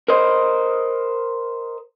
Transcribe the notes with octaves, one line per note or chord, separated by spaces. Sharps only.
A#4 C5 D#5